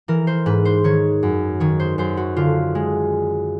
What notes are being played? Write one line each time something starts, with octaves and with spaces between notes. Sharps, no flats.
E3 A#4
C5
G#2 B4
C5
D#3 C#5
F#2
D#3 C#5
C5
F#2 C5
F#4
D3 F4
G#3